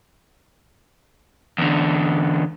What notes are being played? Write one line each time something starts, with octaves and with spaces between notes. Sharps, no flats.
E2 D3